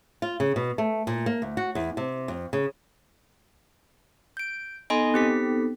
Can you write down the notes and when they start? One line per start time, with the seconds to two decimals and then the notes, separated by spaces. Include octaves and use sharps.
0.22 F4
0.40 C#3
0.56 B2
0.78 A3
1.07 A#2
1.26 A#3
1.42 D2
1.57 F#4
1.75 E2
1.97 C3
2.28 F2
2.53 C#3
4.37 G6 D7
4.90 B3 D#4 A4 D#5 G#5 C6
5.14 C4 G4 B6